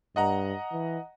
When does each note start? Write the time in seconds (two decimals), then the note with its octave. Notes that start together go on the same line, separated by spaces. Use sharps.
0.16 G2 D#5 F#5 A#5
0.72 E3